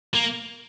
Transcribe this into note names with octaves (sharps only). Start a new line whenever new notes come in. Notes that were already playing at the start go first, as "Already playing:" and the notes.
A#3